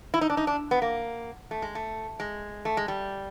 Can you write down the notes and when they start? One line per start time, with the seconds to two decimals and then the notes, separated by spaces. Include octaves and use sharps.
0.14 E4
0.21 D#4
0.30 D4
0.37 D#4
0.47 D4
0.71 B3
0.82 A#3
1.51 A3
1.62 G#3
1.75 A3
2.20 G#3
2.65 A3
2.77 G#3
2.88 G3